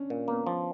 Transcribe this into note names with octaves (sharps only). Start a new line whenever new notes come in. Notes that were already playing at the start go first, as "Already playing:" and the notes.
Already playing: C#4 D4
A#2
A#3 B3
F3